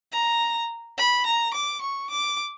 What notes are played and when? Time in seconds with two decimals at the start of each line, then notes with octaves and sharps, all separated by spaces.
0.13 A#5
0.98 B5
1.26 A#5
1.54 D6
1.81 C#6
2.10 D6